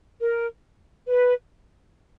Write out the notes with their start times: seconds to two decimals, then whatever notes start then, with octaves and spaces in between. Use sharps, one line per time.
0.20 A#4
1.07 B4